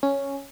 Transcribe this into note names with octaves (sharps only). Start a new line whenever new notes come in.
C#4